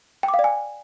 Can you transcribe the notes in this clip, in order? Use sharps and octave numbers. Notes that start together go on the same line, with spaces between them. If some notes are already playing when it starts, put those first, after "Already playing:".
G5
D6
F5
D5
G#5